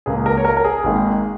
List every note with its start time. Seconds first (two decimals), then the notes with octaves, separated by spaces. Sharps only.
0.06 C#2 C#3 A#3 G#4
0.26 A#4
0.37 C#5
0.45 A#4
0.57 A#4
0.64 G#4
0.84 G#1 G#2 D#3 A#3